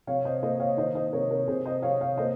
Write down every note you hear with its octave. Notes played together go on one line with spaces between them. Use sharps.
C3 C#5 F5
C5 D#5
A#3 C5 D#5
C#5 F5
D#3 C5 D#5
C5 D#5
C3 A#4 C#5
A#4 C#5
C3 G#4 C5
C5 D#5
C3 C#5 F5
C#5 F5
A#3 C5 D#5